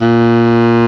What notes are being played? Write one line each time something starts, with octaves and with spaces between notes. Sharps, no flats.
A#2